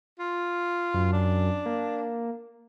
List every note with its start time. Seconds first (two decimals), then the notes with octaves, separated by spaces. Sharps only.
0.19 F4
0.94 F#2
1.12 D4
1.66 A#3